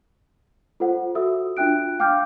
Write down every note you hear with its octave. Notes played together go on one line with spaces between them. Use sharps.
F4 A4 C5 F#5
F#4 A4 E5 D#6 E6
D4 F4 E5 G5 F#6 D7
F5 G5 D6 F6 G6